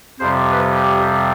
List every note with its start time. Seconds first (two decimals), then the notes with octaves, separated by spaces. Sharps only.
0.20 F2 C3 G3 C5
0.51 B4
0.83 G4